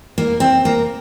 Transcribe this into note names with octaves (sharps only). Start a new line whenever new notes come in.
A#3
C4
A#3